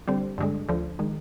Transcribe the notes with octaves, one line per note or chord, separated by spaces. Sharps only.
D3 G3 C4
G2 D3 G#3
D2 D3 F3
D#3 G#3